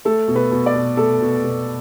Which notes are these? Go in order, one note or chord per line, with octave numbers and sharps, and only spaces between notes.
A3 A4
B2
B4
B2
D5
B2
A3 A4
B2
B2